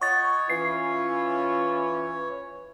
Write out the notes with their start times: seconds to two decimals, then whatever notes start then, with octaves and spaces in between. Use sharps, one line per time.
0.01 F4 C#5 D#5 F#5 C#6 A6
0.50 E3 C#4 E4 F4 C7